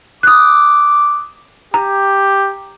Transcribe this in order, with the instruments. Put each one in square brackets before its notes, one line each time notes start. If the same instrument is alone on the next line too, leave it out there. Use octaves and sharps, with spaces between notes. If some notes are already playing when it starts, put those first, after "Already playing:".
[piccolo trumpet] D6 [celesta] D#6 F#6
[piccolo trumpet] G4 [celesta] A#5